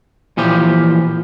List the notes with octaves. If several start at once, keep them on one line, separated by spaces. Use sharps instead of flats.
A#2 E3 F3 G4